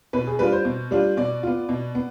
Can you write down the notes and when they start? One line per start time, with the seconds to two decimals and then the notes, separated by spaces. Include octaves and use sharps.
0.13 B2 B4
0.27 G#4
0.39 G3 D4 F4 B4
0.52 C5
0.65 B2
0.91 G3 D4 F4
1.17 B2 D5
1.43 B3 F4
1.69 B2
1.95 B3